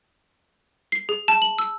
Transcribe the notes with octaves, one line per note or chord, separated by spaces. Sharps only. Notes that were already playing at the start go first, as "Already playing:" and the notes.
C7
G#4
A5
F#7
E6